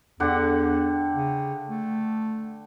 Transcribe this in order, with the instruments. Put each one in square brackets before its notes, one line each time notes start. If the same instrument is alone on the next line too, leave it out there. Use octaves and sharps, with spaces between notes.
[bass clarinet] E2 [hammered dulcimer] D3 G4 F#5
[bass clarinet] C#3
A3